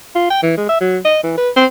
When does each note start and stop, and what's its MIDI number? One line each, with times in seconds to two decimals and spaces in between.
0.15 0.28 65
0.30 0.40 79
0.43 0.55 52
0.57 0.67 56
0.69 0.76 76
0.81 0.98 54
1.05 1.19 75
1.23 1.36 52
1.37 1.50 71
1.56 1.65 60